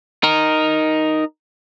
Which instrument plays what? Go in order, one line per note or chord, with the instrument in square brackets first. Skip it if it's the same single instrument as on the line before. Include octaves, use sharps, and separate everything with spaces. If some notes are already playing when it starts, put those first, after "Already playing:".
[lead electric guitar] D#4 A#4